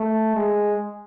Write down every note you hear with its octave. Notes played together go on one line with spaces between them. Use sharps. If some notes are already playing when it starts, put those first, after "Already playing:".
Already playing: A3
G#3